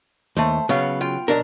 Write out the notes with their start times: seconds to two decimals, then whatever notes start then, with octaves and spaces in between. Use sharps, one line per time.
0.37 D#2 A3 C5
0.69 C#3 F#3 B3 F5
1.01 F4 G5
1.28 B1 D4 A#4